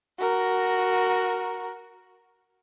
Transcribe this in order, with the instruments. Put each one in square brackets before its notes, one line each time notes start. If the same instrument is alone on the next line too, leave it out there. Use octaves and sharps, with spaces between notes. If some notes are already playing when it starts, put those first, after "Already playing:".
[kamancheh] F#4 A#4